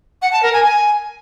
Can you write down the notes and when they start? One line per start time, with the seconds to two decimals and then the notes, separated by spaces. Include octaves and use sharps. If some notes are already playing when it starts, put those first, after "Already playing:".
0.21 F#5
0.32 A5
0.42 A#4
0.53 G#5
0.63 G#5